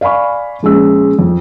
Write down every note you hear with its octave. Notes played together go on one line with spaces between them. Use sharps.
D5 F5 G#5 B5 C#6
A#1 G#3 C#4 E6
F2